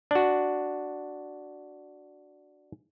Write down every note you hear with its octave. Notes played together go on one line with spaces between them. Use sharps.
D4 F#4